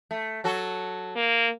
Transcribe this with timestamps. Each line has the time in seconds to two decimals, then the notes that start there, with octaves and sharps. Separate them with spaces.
0.11 A3
0.44 F#3 F#4 A4
1.16 A#3